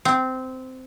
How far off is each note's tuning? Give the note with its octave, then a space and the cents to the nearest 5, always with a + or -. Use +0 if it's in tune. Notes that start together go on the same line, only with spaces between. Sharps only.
C4 -15